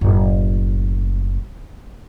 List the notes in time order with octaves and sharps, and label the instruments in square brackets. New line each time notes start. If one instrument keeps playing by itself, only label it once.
[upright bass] F#1 A2